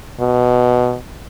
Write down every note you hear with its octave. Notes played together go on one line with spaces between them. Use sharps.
B2